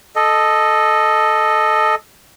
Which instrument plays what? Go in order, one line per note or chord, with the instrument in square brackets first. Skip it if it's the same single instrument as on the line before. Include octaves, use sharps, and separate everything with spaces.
[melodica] A4 D#5